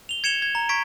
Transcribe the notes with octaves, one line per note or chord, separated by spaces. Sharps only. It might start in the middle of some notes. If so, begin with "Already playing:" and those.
F7 G7
G#6 C#7 E7 F7 G7
G#6
A#5
C#6 G#6 B6 D7